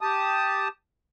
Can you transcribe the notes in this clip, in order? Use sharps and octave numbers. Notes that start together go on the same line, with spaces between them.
G4 A5 D#6